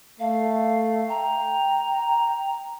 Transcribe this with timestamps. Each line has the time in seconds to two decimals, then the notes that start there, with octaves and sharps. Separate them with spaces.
0.20 A3 F5
1.09 G5 A#5